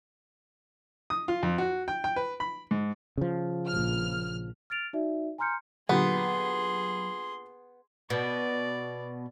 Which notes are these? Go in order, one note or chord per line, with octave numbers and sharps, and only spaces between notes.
D#6
F4
F2
F#4
G5
G5
B4
B5
G#2
C#3 F3
A#1 F6
F6 A6 D7 F7
D#4 F#4 D5 E5
G#5 A#5 C6 F6 G6 C#7
A#2 D3 F#3 B3 G4 G#4 B5 C6
B2 D5